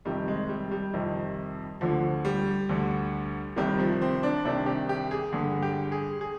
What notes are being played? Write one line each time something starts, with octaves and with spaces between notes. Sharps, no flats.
F2 C3 D#3 G3
G#3
G3
G3
F2 C3 D#3
D2 D3 F3
G3
D2 D3
C2 C3 D#3 G3
F3
C4
D4
C2 C3 D#3 D4
G4
G4
G#4
G2 D3 G#4
G4
G#4
G#4